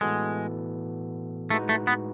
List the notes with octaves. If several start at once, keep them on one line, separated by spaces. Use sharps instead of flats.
A2 E3 G#3 B3 F#4 A4
A2 G#3 A3 D#4 F#4 B4
A3
B3